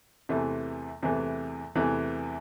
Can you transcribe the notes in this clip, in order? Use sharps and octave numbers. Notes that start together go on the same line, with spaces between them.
E2 C3 E3 A3
E2 C3 E3 A3
E2 C3 E3 A3